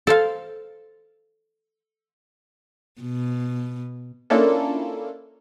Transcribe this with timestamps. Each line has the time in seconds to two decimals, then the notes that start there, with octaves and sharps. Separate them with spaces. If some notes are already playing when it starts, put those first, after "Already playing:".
0.07 A4 C5 F5
3.01 B2
4.30 A#3 C#4 D4 E4 F4 A4